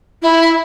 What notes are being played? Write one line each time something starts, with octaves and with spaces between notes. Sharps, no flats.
E4